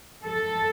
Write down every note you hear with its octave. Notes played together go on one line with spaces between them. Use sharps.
A4